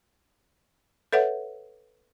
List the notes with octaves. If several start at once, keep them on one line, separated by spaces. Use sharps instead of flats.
A4 B4 C#5 E5 F#5